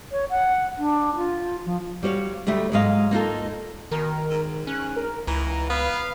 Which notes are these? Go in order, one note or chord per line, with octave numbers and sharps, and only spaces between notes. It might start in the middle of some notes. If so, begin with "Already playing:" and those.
C#5
F#5
D4
F4
F3
G3 F#4 C#5 F5
D2 G3 A3 E5
G#2 F#3 G#3 D#5 F5
A#3 D#4 F4 A4
B2 D#3 A#4
G#2
C#4 F#6
A#4
C#2 E3 A#5
B3 B4 F5